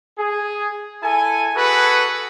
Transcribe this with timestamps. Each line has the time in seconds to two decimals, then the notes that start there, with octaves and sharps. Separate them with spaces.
0.19 G#4
1.02 E4 A4 G#5
1.55 F#4 G#4 A4 B4